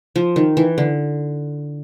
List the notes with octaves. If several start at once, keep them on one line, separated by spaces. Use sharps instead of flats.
F3
D#3
E3
D3